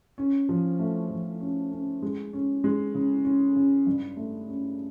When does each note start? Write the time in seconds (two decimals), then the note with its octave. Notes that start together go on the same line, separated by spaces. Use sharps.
0.18 C#4
0.49 F3
0.79 A3
1.10 F3
1.41 C#4
1.72 C#4
2.02 G#3
2.33 C#4
2.64 G#3
2.94 C#3
3.25 C#4
3.56 C#3
3.87 G2
4.17 A3
4.48 C#4